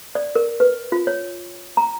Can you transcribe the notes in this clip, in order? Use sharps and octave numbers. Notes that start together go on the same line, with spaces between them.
D5
A#4
B4
F4
C#5
A#5